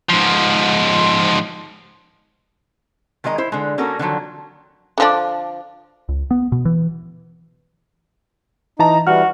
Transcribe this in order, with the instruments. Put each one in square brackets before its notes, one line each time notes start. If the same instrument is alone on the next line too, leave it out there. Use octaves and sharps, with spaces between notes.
[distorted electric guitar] G#2 F3
[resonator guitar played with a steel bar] D#3 G#3 A#4 D#5 A#5
E4 C5
D3 G#3
A#3 C#4 F#4 A4 A#4
D3 D#3 F3 F#3
[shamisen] D3 F3 D4
[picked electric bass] C#2
B3
B2
E3
[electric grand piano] E3 A5 A#5 [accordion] D#4
[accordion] E3 G3 [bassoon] F#4 [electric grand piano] F6